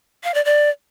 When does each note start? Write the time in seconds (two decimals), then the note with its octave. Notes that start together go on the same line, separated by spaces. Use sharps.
0.24 F5
0.34 D5
0.45 D5